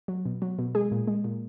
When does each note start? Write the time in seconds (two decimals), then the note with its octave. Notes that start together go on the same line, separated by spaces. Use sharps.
0.08 F#3
0.26 B2
0.42 F#3
0.59 B2
0.75 G#3 G#4
0.92 A#2
1.08 G#3
1.24 A#2